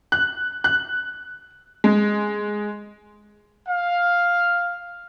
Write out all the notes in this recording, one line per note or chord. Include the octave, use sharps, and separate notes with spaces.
F#6
F#6
G#3
F5